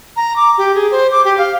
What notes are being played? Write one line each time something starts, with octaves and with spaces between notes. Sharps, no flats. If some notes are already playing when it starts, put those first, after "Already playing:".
A#5
D6
G4
G#4
C5
D6
G4
F5